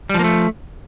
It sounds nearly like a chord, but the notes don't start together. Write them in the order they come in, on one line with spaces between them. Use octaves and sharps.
G3 F3 A#3 A3